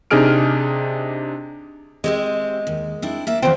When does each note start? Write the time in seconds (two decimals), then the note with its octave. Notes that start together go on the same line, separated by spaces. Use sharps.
0.11 C3 D4 D#4 G#4 F6 D7
2.04 G#3 C4 G4 E5
2.67 D#2
3.02 C4 D4 E4
3.27 A#3 D5 E5
3.42 E2 D#3 F3 C4